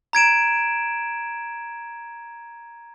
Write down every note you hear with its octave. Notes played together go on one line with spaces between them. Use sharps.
A#5 G#6 D7 E7